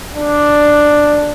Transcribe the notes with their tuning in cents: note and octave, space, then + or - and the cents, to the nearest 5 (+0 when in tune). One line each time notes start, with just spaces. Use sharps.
D4 +5